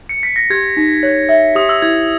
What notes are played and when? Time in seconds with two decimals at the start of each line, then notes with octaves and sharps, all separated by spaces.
0.09 C#7
0.23 B6
0.36 A#6
0.50 G4 G#6
0.77 D#4
1.03 C#5
1.29 E5
1.55 G4 D#6
1.69 E6
1.82 E4 G#6